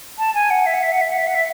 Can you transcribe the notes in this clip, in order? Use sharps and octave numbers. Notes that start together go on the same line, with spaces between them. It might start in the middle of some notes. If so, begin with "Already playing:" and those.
A5
G#5
F#5
E5
F#5
E5
F#5
E5
F#5
E5
F#5
E5